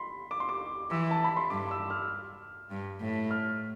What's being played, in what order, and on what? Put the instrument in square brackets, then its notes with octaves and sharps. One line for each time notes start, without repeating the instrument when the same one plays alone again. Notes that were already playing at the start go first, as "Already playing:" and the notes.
Already playing: [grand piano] B5 C6
D6
C6
D6
[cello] E3 [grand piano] E6
[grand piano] A5
B5
C6
[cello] G2 [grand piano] D6
[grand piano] E6
F6
[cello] G2
A2
[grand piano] F6